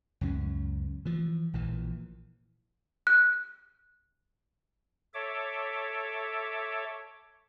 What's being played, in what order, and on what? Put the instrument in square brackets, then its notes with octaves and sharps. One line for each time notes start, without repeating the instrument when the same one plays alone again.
[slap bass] C#2 F#2 G#3 C#4
E3 F3
A#1 A#2 E3
[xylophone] F#6
[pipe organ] A4 C#5 E5 D6